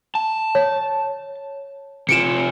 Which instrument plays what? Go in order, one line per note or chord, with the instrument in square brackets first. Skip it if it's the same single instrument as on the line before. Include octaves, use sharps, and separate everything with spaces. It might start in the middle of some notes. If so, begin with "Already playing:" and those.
[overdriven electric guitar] A5
[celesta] C#5
[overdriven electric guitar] C3 F4 [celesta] C#7 D7 E7